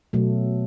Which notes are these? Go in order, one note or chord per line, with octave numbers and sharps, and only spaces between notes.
B2 F#3 A3